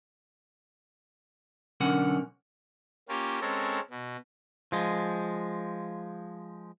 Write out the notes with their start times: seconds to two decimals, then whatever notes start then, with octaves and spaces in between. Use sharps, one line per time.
1.80 B1 D3 C#4 A#4 F#5
3.09 A#3 C#4 F4 G4
3.41 G#3 C4 C#4 A4 A#4
3.90 B2
4.72 F3 G#3